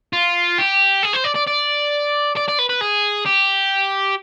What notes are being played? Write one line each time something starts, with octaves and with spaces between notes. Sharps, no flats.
F4
G4
G#4
C5
D5
D5
D5
D5
D5
B4
B4
G#4
G4